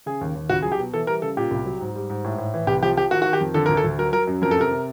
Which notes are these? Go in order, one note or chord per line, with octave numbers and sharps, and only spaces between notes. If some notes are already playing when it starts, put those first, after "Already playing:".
C#3 G#4
D#2
D#2
C#2 F#4
F#3 G#4
G4
B2
E3 A4
G3 A#4
C#3 A4
A#2 G4
C2
F#3
G#2
G3
G#2
A2
A2
E3
C2 G4
F3 G4
F3 G4
D#3 F#4
D#3 F#4
G4
F2
D3 A4
D2 A#4
A4
D2
F#3 A#4
F#3 A#4
F#2
F2 A#4
A4
C3 A#4
C3